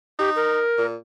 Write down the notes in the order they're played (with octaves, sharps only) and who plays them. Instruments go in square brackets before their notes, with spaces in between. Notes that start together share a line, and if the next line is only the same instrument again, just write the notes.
[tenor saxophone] D#4 [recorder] G4
[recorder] A#4
[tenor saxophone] A#2